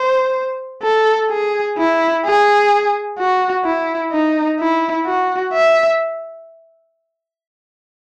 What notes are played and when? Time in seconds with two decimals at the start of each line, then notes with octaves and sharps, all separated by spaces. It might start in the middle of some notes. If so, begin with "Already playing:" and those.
Already playing: C5
0.83 A4
1.30 G#4
1.78 E4
2.25 G#4
3.19 F#4
3.65 E4
4.12 D#4
4.59 E4
5.06 F#4
5.53 E5